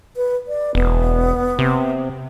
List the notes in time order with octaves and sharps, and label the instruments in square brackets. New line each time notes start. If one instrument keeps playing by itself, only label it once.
[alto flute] B4
D5
[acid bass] E1 [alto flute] B3
[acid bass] C3